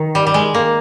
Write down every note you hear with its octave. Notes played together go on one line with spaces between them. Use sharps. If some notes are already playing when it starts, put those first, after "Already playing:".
Already playing: D#3
G3
G3
G#3
A#3